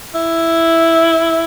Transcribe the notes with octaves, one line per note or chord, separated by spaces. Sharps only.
E4